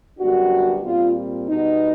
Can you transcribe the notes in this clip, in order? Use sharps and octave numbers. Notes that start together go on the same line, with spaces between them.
F#2 D3 G3 B3 D4 F#4
A#2 G3 C4 F4
B2 G3 B3 D#4